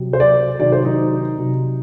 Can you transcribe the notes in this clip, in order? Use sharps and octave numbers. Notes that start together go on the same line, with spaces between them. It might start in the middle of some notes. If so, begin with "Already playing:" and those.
Already playing: C3 F#3
C5
D5
C3 D#3 F#3 D5
C5
D#4
C3 F#3